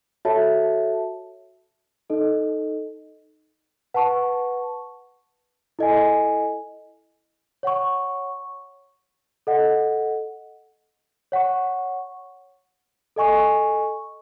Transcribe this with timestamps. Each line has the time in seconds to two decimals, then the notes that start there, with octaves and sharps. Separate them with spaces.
0.25 F#4 A4 C#5 E5 A5
2.10 D#4 A4 D#5
3.94 B4 F#5 A5 C#6
5.79 E4 A4 D#5 G#5
7.63 C#5 F#5 C#6
9.47 A4 D#5 F#5
11.32 C#5 F#5 C#6
13.16 A4 D#5 G#5 C#6